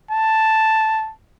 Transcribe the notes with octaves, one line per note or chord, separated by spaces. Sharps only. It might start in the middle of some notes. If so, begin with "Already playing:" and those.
A5